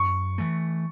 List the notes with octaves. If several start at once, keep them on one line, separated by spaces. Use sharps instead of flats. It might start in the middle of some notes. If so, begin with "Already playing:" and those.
Already playing: F#2 C#6
E3 A3